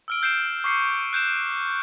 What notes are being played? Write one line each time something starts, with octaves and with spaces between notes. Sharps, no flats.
E6 F6 D7
F6 G6 C7 D7 E7
C#6 D6 C7 C#7
F#6 G6 D7 E7